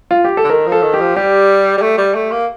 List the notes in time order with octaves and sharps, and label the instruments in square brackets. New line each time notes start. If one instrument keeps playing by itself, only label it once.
[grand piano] F4
G4
A4
[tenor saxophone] D3
[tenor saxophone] D#3 [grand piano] A#4
[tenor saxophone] F3
[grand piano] A4
[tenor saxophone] D#3
[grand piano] G4
[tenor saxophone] F3
[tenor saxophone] G3 [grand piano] G4
[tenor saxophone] G3
A3
G3
A3
A#3